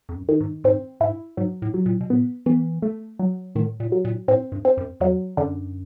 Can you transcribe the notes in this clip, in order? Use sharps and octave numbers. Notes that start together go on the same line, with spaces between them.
F2
F#2
D#3
G#2
G#2 C4
G#2 E4
G#2 F#3
A2
F#3
A#2
B2
A#2 B3
E3 B3
A3
F#3
A2 D#3
A#2
F#3
A#2
A2 C4
G2
C4
F#2
F2 F#3
F#2 D3